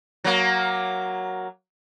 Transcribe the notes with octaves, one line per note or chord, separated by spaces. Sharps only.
F#3 A#3